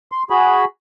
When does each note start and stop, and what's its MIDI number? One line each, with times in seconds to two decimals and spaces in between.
0.12 0.23 84
0.30 0.65 66
0.30 0.65 68
0.30 0.65 83